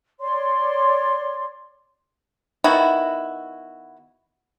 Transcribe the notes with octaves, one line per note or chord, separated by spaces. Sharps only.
C#5 D5 C6
D#3 B3 E4 F#4